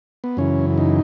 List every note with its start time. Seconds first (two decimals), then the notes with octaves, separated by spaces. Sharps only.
0.24 B3
0.37 F#2 C#3 E3 C#4
0.78 D#4